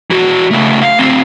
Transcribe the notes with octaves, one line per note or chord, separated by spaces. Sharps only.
E3 F#4
C#3 A3
F5
D2 C4